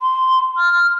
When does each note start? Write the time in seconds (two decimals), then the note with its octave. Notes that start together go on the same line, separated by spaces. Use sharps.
0.01 C6
0.58 F6